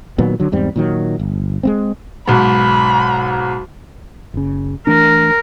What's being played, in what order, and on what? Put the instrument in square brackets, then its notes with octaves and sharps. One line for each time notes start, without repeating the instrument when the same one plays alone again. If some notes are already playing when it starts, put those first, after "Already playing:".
[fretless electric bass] A#2 D#3 F#3 B3
D3 F#3
E2 G#2 G3 C4
A#2 D#3 F#3
G1
G#3 B3 C4
[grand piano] B1 G#2 [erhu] B5
[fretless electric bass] F#1 C#3
[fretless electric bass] E3 A3 D4 [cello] A#4